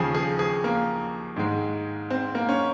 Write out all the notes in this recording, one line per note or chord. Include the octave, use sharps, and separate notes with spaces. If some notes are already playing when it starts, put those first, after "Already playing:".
Already playing: D#2 C#3 F3 G#4
G#4
G#4
A#3
G#2 D#3 G#3
C4
A#3
C#4